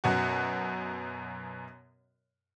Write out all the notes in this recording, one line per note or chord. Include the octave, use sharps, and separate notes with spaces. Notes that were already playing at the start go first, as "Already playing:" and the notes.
F#2 B2 F#4